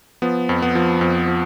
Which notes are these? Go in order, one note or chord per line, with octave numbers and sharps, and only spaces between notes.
F3 B3
F2
B3
F3
F2
F3